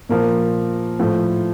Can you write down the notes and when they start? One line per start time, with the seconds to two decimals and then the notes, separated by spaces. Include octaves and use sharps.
0.09 A#2 F3 A#4
0.99 A2 F3